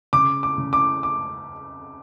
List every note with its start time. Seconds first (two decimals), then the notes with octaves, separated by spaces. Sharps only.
0.13 C#3 D6
0.43 D6
0.58 C#3
0.73 D6
1.03 D6